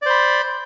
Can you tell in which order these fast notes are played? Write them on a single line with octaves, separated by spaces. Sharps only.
D5 C5 B5